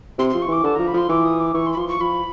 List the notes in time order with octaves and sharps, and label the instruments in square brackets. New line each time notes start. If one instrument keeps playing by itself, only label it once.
[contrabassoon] C3 [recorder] C6
[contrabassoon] F3 [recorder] C6
[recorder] C#6
[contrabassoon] E3 [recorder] D6
[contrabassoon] D3 [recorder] A5
[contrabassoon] F3 [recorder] A#5
[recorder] B5
[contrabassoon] F3 [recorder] C6
[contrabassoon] E3 [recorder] D6
[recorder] D#6
D6
[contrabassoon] E3 [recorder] C#6
[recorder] C6
B5
[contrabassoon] F3 [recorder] C6
[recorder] C#6
[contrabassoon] F3 [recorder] B5